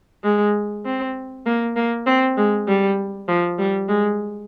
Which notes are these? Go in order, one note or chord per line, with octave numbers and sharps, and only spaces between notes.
G#3
C4
A#3
A#3
C4
G#3
G3
F3
G3
G#3